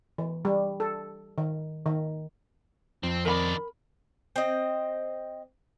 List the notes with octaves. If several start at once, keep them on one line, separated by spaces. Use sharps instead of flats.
E3
G3
A4
D#3
D#3
F2 C4
D#3 A#4 D5 B5
C4 D#5